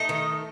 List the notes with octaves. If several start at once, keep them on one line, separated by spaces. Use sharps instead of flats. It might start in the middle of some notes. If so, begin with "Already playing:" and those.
Already playing: A3 D#4 D#5
D#3